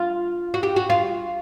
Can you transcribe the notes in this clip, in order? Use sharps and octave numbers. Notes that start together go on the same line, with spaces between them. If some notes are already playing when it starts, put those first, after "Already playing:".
Already playing: F4
F#4
G4
F#4
F4